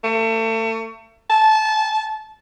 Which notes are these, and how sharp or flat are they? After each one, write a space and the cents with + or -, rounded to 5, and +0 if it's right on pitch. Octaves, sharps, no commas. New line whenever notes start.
A3 +35
A5 -20